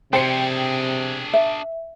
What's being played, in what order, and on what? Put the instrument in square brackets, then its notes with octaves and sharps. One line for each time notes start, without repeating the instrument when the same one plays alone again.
[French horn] C3 [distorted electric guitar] D4 G#4 [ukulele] C5 [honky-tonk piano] G5 C7 C#7
[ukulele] E5